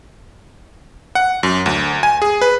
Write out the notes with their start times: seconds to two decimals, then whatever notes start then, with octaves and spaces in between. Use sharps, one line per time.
1.15 F#5
1.43 F#2
1.66 D2
2.03 G#5
2.22 G#4
2.42 B4